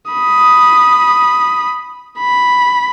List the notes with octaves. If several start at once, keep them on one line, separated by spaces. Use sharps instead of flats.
B5 D#6
B5